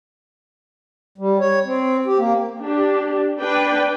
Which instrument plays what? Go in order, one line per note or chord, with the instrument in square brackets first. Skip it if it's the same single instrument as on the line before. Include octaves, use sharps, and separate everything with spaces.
[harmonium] G3
C#5
C4
G4
A#3
[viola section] D4 G4
D4 B4 G5